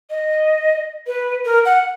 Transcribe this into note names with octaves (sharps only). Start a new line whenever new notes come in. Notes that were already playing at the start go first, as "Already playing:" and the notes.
D#5
B4
A#4
F#5